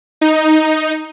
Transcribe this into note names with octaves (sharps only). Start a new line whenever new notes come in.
D#4